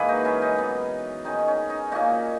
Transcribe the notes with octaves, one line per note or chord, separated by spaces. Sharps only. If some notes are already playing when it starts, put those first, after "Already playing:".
Already playing: G#2 E3 A#3 G#4 B4
D#4 F#4
C#4 E4
D#4
F#2 E3 B3
D#3 G#3 C#4 D#4
C#4
D#4
A#2 A#3 C#4 D#4 F#4